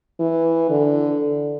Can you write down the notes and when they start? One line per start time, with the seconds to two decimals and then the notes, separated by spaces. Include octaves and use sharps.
0.20 E3
0.70 D3